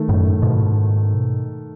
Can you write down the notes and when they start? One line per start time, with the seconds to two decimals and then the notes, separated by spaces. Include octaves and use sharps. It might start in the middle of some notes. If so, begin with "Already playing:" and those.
Already playing: D#3 A3
0.09 F#2 A2
0.42 G#2 B2